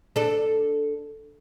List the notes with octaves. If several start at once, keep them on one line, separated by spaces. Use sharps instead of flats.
D4 A4